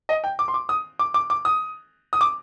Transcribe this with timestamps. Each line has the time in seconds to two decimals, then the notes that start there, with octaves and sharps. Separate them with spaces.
0.09 D#5
0.24 G5
0.39 D6
0.48 C6
0.54 D6
0.69 D#6
0.99 D6
1.14 D6
1.30 D6
1.45 D#6
2.13 D#6
2.21 D6